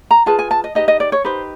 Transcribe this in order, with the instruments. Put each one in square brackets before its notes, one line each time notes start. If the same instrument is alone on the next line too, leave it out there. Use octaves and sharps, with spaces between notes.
[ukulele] A#5
F4 G#4 B4 A5
G#5
A5
D#5
D#4 G4 B4 D#5
D#5
D5
C#5
D#4 G4 B4 C5